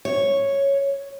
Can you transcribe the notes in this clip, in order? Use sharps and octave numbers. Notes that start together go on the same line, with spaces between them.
C#5